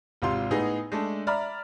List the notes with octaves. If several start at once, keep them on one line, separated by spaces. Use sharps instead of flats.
G#1 C3 F4 C6
A2 B3 D#4 G#4
G#3 A3 D4
D5 E5 A#5 B5 F6